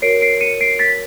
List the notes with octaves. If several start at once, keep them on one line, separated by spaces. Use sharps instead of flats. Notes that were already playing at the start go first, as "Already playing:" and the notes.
F#4 A#4 C#5 C7 D7
C7 D7
C#7 D#7
C7 D7
A6 B6